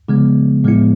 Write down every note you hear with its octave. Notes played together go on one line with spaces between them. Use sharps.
C#3 F3 G#3 B3
A2 F3 G#3 B3 E4